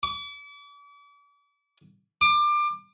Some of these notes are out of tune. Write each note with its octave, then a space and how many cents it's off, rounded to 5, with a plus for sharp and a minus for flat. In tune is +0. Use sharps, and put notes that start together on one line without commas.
D6 -40
D6 +25